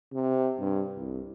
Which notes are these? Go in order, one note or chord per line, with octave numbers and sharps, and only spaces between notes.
C3
G2
C2